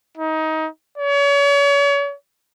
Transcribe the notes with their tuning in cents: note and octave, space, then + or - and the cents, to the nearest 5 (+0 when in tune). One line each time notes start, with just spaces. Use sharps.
D#4 +25
C#5 +35